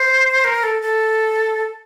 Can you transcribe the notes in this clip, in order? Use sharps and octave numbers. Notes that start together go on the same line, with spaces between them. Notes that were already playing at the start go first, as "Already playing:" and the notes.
Already playing: C5
A#4
A4
A4